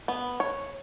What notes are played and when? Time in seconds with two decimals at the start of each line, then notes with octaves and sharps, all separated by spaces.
0.08 B3
0.40 C#5